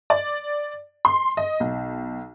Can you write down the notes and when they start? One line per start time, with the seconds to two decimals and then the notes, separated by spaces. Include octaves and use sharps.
0.10 D5
1.05 C6
1.37 D#5
1.60 B1